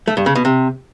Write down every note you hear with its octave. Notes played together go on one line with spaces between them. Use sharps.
A3
G2
C#3
B2
C3